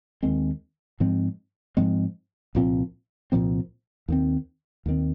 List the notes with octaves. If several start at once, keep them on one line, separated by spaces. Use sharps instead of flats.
D#2 D#3 G#3 C4
G#2 F3 G#3 C4
G#2 F3 G#3 C4
C2 A#2 F3 C4
C2 A#2 F3 C4
D#2 D#3 C4
D#2 D#3 C4